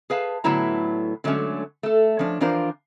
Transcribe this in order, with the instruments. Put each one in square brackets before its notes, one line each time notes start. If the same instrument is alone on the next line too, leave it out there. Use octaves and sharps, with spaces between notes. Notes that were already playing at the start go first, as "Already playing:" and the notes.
[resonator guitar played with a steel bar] G#4 B4 F5 A5
A2 D3 F#3 B3 E4 A#5
D3 F#3 G#3 A3 C#4
A3 A4
F3 C#4 D4
E3 F3 D4 F4 A#4 C5